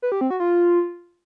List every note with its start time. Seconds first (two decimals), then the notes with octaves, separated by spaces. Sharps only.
0.02 B4
0.12 G4
0.21 C4
0.30 F#4
0.40 F4